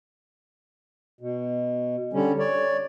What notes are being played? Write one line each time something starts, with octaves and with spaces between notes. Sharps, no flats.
B2
D3 G3 C#4
C#5 D5